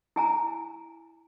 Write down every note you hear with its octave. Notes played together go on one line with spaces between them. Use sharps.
E4 G#5 A#5